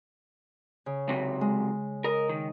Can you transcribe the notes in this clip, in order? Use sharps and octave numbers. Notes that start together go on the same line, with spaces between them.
C#3
C3 F#3
G#3
A#4 D#5
D#3